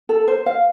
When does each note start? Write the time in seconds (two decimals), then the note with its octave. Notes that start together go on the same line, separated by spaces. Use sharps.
0.09 A4
0.28 C5
0.46 F5